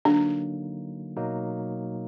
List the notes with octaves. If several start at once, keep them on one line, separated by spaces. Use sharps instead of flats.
D3 F#3 A#3 D4 D#4
B2 F#3 A#3 D#4